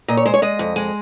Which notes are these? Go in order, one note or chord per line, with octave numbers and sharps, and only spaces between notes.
A#2 D#5
C#5
G#3 C5
C#5
G#3 D#5
F2
G#3